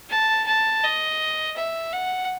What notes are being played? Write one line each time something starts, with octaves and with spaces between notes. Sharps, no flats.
A5
A5
D#5
E5
F#5